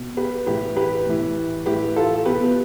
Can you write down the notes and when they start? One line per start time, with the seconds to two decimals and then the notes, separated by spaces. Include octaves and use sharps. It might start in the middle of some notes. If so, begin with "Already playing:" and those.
Already playing: B2
0.17 G4 B4
0.46 A2 E3 G4 B4
0.77 G4 B4
1.06 A2 E3
1.66 A2 E3 G4 B4
1.96 F4 A4
2.26 B2 G4 B4